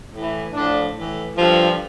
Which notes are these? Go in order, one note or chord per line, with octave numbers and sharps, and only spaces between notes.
A2 E3
A2 F3 D4
A2 E3
G2 D3 F3